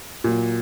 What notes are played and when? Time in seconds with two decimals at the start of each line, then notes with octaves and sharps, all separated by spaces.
0.24 A#2 F#3